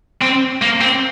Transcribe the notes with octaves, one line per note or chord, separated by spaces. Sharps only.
C4
A#3
C4